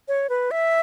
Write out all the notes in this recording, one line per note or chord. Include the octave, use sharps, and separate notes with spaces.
C#5
B4
E5